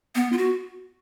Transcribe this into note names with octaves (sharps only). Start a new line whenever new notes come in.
B3
F4
F#4